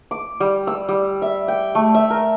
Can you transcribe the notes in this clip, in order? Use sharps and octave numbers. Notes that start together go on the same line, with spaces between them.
D6
G3
E6
G3
E5
G5
A3
E5
A#4